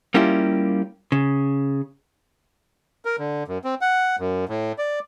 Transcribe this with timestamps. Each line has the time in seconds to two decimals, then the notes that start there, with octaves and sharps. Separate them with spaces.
0.14 G3 A#3 C#4 E4 F4 G4
1.12 C#3
3.05 A#4
3.19 D3
3.48 F#2
3.64 C4
3.81 F#5
4.19 F#2
4.49 A2
4.78 D5